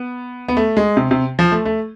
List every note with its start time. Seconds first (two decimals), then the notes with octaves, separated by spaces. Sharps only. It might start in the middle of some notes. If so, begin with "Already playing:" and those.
Already playing: B3
0.48 B3
0.57 A3
0.77 G#3
0.97 C3
1.11 C3
1.39 F3
1.52 A3
1.65 A3